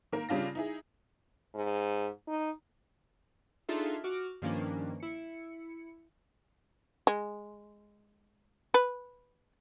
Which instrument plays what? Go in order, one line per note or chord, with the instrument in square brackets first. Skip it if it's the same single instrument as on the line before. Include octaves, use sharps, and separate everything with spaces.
[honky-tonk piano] D#3 A#3 A#4
C#3 G3 D4 F4 A#6
D#4 E4 G#4
[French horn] G#2
D#4
[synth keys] D4 D#4 F4 G#4 A4 E5
F#4 D6 F6 D7
G2 D#3 F3 A#3 C#4 D4
E4 C#7
[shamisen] G#3
B4